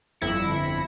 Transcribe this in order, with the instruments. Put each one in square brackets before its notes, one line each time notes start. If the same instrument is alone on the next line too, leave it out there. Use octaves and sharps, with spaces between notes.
[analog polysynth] G1 F2 E4 A#6 C#7